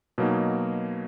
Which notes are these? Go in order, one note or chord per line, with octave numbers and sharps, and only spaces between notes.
B2 F#3 A#3 D#4